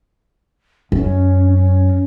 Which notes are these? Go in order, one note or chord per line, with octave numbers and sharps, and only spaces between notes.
F#2 C#4
C#4